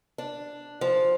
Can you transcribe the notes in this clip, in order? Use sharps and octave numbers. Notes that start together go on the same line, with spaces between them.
D4
F3